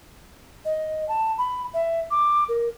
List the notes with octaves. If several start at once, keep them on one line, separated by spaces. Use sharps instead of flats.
D#5
A5
B5
E5
D6
A#4